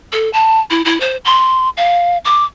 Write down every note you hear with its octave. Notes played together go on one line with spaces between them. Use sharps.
A4
A5
E4
E4
C5
C6
F5
D6